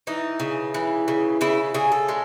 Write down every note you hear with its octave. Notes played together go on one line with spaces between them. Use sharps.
E3 D#4
C#3
E3
C#3
C#3 E4
C#3 G#4
A4
G#3